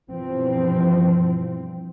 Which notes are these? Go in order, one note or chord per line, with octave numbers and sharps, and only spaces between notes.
G2 B2 E3 F3 C4